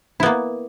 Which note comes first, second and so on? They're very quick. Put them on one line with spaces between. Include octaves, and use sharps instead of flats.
E4 B3 A#3